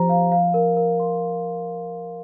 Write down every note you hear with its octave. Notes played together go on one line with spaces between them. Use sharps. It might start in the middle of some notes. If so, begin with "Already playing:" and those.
Already playing: F3 G4 C5 A#5
F5
F5
A#4
A#4
C6